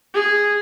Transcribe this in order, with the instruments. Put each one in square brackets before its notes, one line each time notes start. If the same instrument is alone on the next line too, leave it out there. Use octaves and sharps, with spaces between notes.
[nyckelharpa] G#4